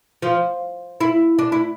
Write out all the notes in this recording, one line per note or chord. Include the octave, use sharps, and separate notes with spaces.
F3
E4
D4
E4